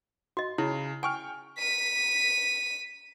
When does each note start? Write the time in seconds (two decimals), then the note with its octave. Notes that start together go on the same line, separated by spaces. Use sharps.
0.37 F#4 D#5 C6
0.58 C#3 E4
1.03 G5 G#5 C#6 F6
1.58 B6 D#7